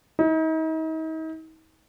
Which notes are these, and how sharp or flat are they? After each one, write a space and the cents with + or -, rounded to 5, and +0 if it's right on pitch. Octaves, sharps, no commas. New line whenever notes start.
D#4 +40